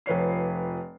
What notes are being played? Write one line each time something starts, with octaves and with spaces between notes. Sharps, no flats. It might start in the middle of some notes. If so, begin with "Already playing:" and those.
F1 F3 B4 C#5 C7